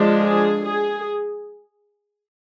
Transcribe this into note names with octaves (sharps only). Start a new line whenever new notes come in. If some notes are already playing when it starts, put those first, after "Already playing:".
Already playing: F3 G#3 D4
G#4
G#4